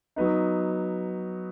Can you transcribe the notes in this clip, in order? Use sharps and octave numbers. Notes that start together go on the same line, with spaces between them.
F#3 B3 D#4